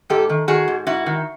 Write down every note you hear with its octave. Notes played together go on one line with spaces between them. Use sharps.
G#2 G4 A4
D#3
D#3 F#4 G#4
G#2
G#2 E4 F#4
D#3